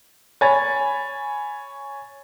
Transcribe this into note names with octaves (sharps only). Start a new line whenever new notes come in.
C#5 G#5 B5 A6